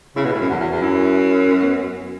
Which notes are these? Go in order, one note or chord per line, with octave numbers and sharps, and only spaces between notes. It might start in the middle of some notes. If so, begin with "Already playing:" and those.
C#3 E4
B2
A2 E4
F#2
E2 F#4
E2
E2
F#2 E4
C#4
B3